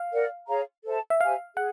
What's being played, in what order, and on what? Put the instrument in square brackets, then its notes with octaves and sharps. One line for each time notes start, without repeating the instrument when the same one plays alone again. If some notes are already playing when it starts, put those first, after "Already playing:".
Already playing: [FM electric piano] F5
[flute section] A#4 D5 F#5
G#4 C#5 F5 A#5
A4 C5 E5 A5
[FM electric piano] E5
[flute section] G4 C5 E5 G#5 [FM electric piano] F5
[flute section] G#4 [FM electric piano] F#5